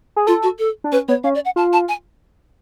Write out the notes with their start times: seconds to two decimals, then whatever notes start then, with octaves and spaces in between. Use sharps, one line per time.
0.16 G#4
0.27 F4 A4
0.43 F#4
0.59 A4
0.84 D4
0.92 C#4 B4
1.08 B3 C#5
1.24 C#4 F5
1.35 D5
1.45 F#5
1.56 F4 A5
1.73 A5
1.88 G#5